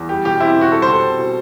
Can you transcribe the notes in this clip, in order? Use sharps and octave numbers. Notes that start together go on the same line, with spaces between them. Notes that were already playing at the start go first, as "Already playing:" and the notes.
Already playing: E2
G3 G4
B2 G4
C4 E4
B2
F#4
G3 A4
C5
B2
A4
C4
B2